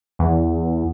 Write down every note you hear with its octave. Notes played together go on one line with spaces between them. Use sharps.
E2